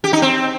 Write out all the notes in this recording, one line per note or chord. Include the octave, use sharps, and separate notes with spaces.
G4
D#4
C4